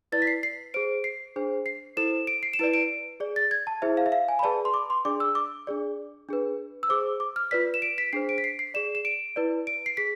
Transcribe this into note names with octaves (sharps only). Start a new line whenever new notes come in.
E4 B4 D5 A6
B6
C7
C7
G#4 C5 D7
C7
D4 G#4 C5
C7
E4 A4 C5 E7
D7
C7
E7
E4 B4 D5 D7
D7
G#4 D5
A6
G#6
A5
E4 G#4 C5 E5
F5
E5
F5
G#5
B5
G#4 B4 D5 A5
C6
D6
C6
D4 G#4 D5 D6
E6
D6
D4 G#4 D5
D4 G#4 B4
E6
G#4 C5 D6
D6
F6
F4 B4 D5 B6
E7
D7
B6
D4 G#4 C5 C7
D7
B6
C7
C7
G#4 D5 E7
E7
D7
E4 B4 D5
D7
C7
G#4 B6